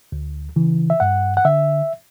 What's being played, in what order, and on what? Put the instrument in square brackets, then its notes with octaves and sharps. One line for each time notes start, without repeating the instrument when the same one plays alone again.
[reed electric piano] D2
C#3 E3
E5
G2 F#5
F#5
D3 E5